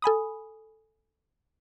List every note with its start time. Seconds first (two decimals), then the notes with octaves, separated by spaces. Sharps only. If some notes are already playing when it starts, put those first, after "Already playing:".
0.02 A4 G#5 B5 D#6